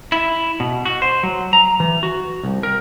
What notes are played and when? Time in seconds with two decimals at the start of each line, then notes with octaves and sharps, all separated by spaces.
0.12 E4
0.60 B2
0.85 F#4
1.02 C5
1.23 F#3
1.53 A#5
1.80 E3
2.03 F#4
2.43 C2
2.63 A#4